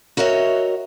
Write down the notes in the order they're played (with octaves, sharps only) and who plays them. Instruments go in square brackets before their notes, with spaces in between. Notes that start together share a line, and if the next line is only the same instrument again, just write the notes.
[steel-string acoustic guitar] F#4 A#4 C#5 D#5 E5